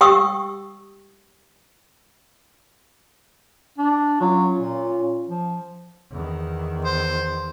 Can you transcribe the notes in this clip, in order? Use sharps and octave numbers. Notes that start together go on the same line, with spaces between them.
G4 G5 C#6 D#6 E6
D4
F#3 C#4 F4
A#2
F3
E2 D#3
C5